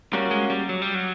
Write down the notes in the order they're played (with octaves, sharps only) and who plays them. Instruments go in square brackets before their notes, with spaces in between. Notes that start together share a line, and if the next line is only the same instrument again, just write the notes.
[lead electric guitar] G3 [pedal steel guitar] A#3 C#4 F#4
[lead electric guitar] G#3
G3
F#3
G3
F#3